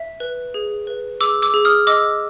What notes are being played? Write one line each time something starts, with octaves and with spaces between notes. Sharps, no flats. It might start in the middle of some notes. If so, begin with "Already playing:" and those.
Already playing: E5
B4
G#4
B4
G#4 D6 E6
D6 E6
G#4
D#6 F6
D#5 D6 E6